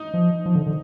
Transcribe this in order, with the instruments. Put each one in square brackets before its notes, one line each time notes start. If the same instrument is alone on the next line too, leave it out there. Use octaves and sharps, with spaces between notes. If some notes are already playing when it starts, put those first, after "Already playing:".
Already playing: [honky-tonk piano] D#4
[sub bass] F3
F3
D3
D3